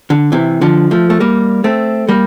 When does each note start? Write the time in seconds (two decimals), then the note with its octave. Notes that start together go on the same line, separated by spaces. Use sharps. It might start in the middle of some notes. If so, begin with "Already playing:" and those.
0.10 D3
0.32 C3 E3
0.61 D3 F3
0.91 F3 A3
1.10 A3
1.20 G3 A#3
1.64 A3 C4
2.09 G3 A#3